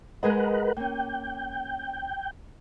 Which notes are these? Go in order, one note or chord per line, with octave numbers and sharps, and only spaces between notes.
G#3 G#4 A#4 B4 D#5 F#5
A#3 C#4 G5